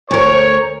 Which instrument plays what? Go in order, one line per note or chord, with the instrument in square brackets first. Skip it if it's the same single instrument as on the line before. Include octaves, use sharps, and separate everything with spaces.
[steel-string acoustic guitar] D2 A#4 [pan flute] C5 [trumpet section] C#5